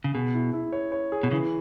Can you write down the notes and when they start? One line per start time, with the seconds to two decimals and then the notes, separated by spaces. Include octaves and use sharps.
0.04 C#3
0.14 B2 G#4
0.35 E4
0.53 E4
0.72 C#5
0.92 C#5
1.12 G#4
1.23 B2
1.31 C#3 E3